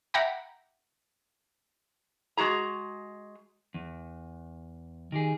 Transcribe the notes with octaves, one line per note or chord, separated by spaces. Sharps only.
E5 F#5 G5 A#5 B5 D6
G#3 F#4 G#4 A#5
E2
D#3 G4 G#4